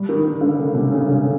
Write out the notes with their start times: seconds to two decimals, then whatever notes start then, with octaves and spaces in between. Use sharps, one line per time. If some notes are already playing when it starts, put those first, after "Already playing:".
Already playing: G3
0.09 D#3
0.25 D#3
0.41 D3
0.59 C#3
0.75 C3
0.92 C#3
1.08 D3